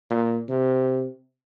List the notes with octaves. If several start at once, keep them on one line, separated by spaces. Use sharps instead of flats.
A#2
C3